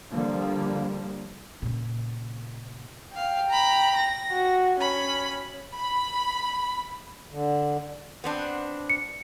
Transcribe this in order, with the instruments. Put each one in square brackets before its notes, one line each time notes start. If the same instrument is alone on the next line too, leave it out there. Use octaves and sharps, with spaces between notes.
[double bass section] D3 F3 G3 A#3
[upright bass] A#2 C#3
[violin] F5 [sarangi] G5
[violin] A#5 B5
A#6
[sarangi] F#4
[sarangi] C#4 [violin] B5
[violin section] B5
[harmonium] D3
[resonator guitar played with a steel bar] B3 C4 D4
[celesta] C#7